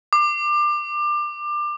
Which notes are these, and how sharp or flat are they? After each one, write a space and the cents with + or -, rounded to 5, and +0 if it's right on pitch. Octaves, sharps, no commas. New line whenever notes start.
D6 +25